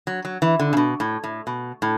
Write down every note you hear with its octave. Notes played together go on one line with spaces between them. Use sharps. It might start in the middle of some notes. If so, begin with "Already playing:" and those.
F#3
F#3
E3
D3
C#3
B2
A2
A2
B2
A2